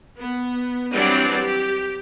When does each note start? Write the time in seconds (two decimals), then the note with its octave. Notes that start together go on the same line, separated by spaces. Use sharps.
0.17 B3
0.93 E3 F#3 G3 C4 D4 D5
1.39 G4